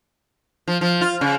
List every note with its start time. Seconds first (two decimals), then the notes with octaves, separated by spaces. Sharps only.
0.68 F3
0.81 F3
1.01 F4
1.21 C#3